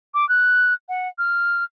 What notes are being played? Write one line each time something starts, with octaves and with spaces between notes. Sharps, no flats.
D6
F#6
F#5
F6